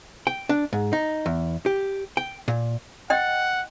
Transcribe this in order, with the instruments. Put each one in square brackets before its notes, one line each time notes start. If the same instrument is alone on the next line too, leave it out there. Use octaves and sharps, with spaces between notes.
[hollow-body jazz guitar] G5
D4
G#2
D#4
E2
G4
G5
A#2
[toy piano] D#5 G5 [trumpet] F#5